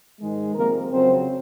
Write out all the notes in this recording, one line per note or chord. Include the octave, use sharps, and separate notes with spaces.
G#2 D#3 G#3
C3 F3 G#3 A#3 A#4
F2 C#3 F#3 C4 C5